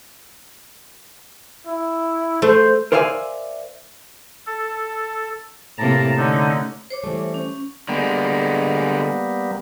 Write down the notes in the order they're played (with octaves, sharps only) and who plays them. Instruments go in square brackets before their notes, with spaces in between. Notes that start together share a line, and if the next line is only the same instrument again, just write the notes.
[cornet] E4
[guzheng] A3 [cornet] C5
[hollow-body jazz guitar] A#4 C5 D5 E5 F5 G#5
[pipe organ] A4
[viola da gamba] A2 C3 A#3 [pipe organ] A5 A#5
[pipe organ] D3 D#4 [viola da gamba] A3 C#4
[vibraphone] C5 C#5 D6
[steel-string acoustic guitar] E3 G3 A3
[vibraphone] C#4
[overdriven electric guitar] D3 G#3 [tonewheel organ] G3 A#3 B3